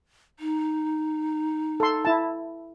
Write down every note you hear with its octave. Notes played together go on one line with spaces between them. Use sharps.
D#4
A4 C6
E4 A5